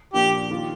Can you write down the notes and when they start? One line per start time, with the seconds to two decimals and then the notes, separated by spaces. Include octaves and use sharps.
0.13 A#2 F3 A#3 D4 F4 G4
0.50 D#3 A#3 F4